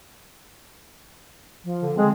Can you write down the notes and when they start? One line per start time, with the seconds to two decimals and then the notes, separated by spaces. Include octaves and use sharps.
1.64 F3
1.82 D3
1.97 G#3 C4 G#4